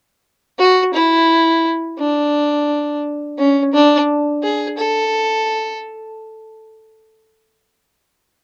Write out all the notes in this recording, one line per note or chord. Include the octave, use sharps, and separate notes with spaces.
F#4
E4
D4
C#4
D4
G#4
A4